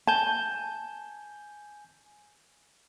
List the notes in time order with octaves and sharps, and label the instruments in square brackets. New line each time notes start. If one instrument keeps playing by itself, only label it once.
[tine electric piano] G#5 G6 [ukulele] A5